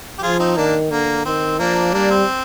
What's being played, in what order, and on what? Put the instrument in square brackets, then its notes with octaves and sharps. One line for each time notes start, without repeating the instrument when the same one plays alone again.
[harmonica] G4
[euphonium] F3 [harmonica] F4 G#4
[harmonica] C4 D#4
[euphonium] D#3 [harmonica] A#3 D4
[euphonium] D3 [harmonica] A#3
[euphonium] D#3 [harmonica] C4
[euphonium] F3 [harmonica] A#3 D4
[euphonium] G3 [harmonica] A#3 D4
[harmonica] C4